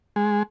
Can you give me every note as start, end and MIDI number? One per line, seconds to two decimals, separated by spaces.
0.16 0.43 56